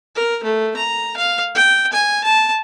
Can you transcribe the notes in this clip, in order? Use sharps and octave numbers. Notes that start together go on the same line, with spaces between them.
A#4
A3
A#5
F5
G5
G#5
A5